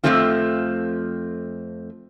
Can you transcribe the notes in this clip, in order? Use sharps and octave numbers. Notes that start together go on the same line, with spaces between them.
F2 D#3 F3 A3 C4 F4